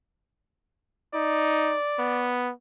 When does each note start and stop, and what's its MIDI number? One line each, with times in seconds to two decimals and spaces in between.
1.14 1.76 63
1.14 2.37 74
1.99 2.51 59